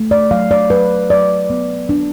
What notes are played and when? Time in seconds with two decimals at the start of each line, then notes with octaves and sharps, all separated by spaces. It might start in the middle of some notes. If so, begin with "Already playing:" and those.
Already playing: A3
0.11 D5
0.31 F#3 F5
0.51 D5
0.70 F#3 B4
1.10 F#3 D5
1.50 B3
1.89 D4